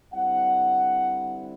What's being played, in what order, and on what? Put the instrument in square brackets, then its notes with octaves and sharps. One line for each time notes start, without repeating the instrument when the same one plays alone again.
[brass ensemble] D3 G3 C4 E4 F#5